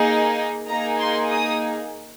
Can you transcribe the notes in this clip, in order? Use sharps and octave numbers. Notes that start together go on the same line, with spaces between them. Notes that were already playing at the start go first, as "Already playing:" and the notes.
Already playing: A#3 D#4 G#4
A#3 D#4 G#4 A#5
C6
D#6